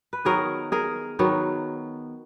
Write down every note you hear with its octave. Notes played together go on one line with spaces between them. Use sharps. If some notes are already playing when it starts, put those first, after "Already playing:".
B4
D#3 F#3 B3 G#4 A#4
G#4 A#4
D#3 F#3 B3